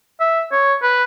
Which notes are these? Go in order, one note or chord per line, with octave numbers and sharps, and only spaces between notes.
E5
C#5
B4